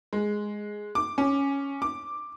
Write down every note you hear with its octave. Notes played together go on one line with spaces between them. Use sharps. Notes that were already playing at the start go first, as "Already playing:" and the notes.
G#3
D6
C#4
D6